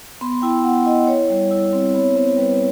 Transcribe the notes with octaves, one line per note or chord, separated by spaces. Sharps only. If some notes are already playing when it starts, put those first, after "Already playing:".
B3 C6
E4 G5
B3 F#5
E4 D#5
E4 C#5
G3
E4
C4
B3 C#5
B3 C5
G3 B4